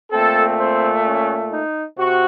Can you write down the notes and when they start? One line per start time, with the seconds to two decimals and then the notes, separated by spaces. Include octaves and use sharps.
0.11 A#2 A3 C4 A4
0.58 C4
1.05 C#4
1.51 D#4
1.97 C3 F#4